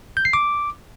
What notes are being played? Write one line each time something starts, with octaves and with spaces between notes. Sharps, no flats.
G6
C7
D6